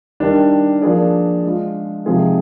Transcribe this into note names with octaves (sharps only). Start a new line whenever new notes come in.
D#3 G3 D4
F3 A#3 D4 G#4 D5
G#3 D4 F4
C3 F3 G#3 D#4 G#4